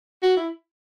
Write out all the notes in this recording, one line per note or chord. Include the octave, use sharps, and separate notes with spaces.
F#4
E4